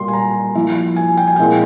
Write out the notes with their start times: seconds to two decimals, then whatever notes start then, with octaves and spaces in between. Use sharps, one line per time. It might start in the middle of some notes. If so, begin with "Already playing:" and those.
Already playing: A#2 G3 A#3 C6
0.08 G#5
0.13 A#5
0.55 F3 A#3 E4
0.96 G#5
1.17 G5
1.27 G#5
1.36 A#2 G#3 C4 E4 G5